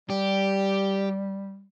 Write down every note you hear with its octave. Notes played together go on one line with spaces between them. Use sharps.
G3 G4